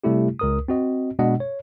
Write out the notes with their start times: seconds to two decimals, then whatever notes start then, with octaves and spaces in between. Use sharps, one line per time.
0.04 C3 G3 A3 E4 G4
0.39 C#2 A#4 D#6
0.68 C4 F#4 D#5
1.19 B2 G#3 D4 D#5 F#5
1.40 C#5